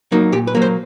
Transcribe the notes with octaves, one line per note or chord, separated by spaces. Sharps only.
F#3 A#3 D#4
A#2 G4
B4
F#3 A#3
C5